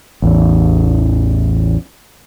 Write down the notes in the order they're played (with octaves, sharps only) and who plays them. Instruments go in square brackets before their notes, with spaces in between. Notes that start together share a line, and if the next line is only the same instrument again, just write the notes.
[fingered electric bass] A1 E2